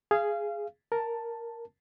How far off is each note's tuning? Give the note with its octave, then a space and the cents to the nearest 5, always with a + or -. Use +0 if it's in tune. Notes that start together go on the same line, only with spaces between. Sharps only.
G#4 +0 F5 -25
A#4 +0 A5 +5